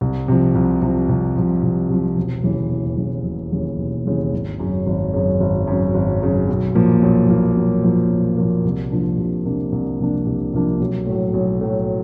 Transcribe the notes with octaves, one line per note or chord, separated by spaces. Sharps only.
C2
C3 F3
C2
C3 F3
C2
C3 F3
C2
C3 F3
E1
D#2 C#3 E3
E1
D#2 C#3 E3
E1
D#2 C#3 E3
E1
D#2 C#3 E3
G#1
F#2 C#3
G#1
F#2 C#3
G#1
F#2 C#3
G#1
F#2 C#3
B1
A#2 F3 A#3
B1
A#2 F3 A#3
B1
A#2 F3 A#3
B1
A#2 F3 A#3
C2
C3 F3 A#3 D4
C2
C3 F3 A#3 D4
C2
C3 F3 A#3 D4
C2
C3 F3 A#3 D4
B1
A2 F#3
B1
A2 F#3